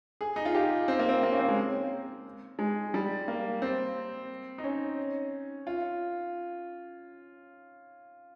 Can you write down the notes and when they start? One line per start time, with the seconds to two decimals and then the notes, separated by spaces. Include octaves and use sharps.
0.21 G#4
0.36 D#4
0.45 F4
0.55 G4
0.88 C4
0.99 A#3
1.09 C4
1.23 A#3
1.32 C#4
1.39 C4
1.49 G#3
2.59 G#3
2.94 G3
3.28 A#3
3.62 C4
4.58 D#4
4.64 C#4
5.67 F4